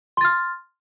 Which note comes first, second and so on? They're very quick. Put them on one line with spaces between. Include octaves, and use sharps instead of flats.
C6 A6 F6